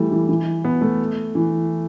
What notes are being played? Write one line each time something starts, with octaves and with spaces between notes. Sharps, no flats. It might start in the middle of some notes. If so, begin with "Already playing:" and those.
Already playing: E3 G3 A3
E3
E3
B3
A3
E3